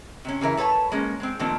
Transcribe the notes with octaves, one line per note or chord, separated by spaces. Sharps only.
C3 C#4
C#3 E3 A#4 E5
A4 B4 C#5 G#5 A5
G#3 A#3 C#4
G#3 C4
A#2 D#3 F3 A3 C4 D4